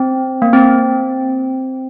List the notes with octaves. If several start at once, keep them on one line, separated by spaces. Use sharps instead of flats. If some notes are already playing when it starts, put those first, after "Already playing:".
Already playing: C4
A#3
C4